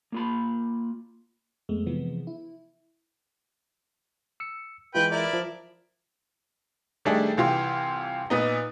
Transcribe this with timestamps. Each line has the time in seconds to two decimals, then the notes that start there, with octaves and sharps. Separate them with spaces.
0.12 A#3 F4 B5
1.69 F2 G#3 A3 B3
1.86 C3 E3 F3 G#3 B3
2.27 E4
4.40 E6 C#7
4.95 E3 G#3 F4 B4 G5
5.11 E4 A#4 D5
5.33 F3
7.05 D#3 G3 A3 D4 G#4
7.37 C2 E3 F4 G4 C6
8.30 A#2 B3 D#4